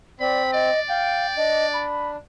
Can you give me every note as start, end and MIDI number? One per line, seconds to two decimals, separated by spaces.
0.20 0.70 60
0.20 0.43 74
0.20 0.50 83
0.53 1.86 74
0.53 0.80 75
0.89 1.27 77
0.89 1.35 79
1.37 2.16 62
1.37 1.67 75
1.73 2.09 83